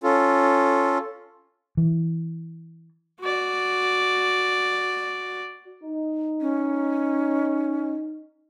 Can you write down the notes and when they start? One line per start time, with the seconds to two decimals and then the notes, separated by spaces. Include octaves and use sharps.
0.03 C#4 F4 A4
1.77 E3
3.21 F#4 D5
5.83 D#4
6.41 C#4